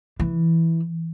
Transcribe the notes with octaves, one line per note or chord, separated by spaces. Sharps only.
E3